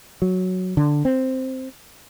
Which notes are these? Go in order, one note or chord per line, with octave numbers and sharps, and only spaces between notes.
F#3
D3
C4